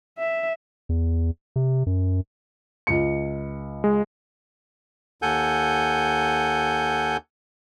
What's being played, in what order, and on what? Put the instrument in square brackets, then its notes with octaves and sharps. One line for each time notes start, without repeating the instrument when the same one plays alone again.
[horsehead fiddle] E5
[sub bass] E2
C3
F#2
[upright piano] C#2 C#7
[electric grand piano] G#3
[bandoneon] D#2 A4 F#5 G#5 G6